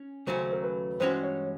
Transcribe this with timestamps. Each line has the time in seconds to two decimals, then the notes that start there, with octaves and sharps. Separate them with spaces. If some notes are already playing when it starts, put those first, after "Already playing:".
Already playing: C#4
0.27 D#2 C#3 F#3 A3 C#4 C5
0.53 A#4
0.63 B4
1.00 G2 E3 G#3 C#4 F#4 C5
1.23 C#5